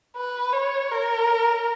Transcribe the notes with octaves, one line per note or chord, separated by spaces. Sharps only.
B4
C#5
A#4